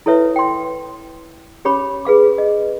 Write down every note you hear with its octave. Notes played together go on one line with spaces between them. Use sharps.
E4 A4 B4 C#5 E5
G5 C6
C#4 G4 C#5 B5 D6
G#4 B4 F5 D6
D#5